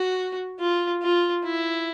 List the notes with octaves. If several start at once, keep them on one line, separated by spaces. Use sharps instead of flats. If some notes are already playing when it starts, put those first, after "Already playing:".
Already playing: F#4
F4
F4
E4